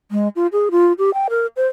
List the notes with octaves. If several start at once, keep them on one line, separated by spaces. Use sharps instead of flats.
G#3
F4
G#4
F4
G4
G5
A#4
C5